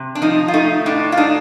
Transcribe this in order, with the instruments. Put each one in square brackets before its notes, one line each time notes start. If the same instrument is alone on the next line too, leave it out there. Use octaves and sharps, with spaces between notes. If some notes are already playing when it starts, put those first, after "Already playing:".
Already playing: [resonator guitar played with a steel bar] C3
D4
F3 D#4
F4
A3 D#4
A2 D4
F4
D4 D#4